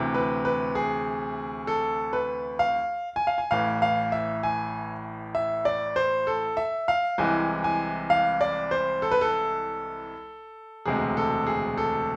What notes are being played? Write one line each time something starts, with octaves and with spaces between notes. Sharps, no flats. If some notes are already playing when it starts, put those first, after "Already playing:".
Already playing: D2 C3 E3
B4
B4
G#4
A4
B4
F5
G#5
F5
G#5
A1 A2 E3 F5
F5
E5
G#5
E5
D5
C5
A4
E5
F5
C2 C3 E3 G#3 G#5
G#5
F5
D5
C5
A4
B4
A4
E1 D2 C3 G#3 G#4
A4
G#4
A4